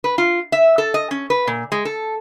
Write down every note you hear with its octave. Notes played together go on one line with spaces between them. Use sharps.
B4
F4
E5
A4
D#5
C#4
B4
A#2
G#3
A4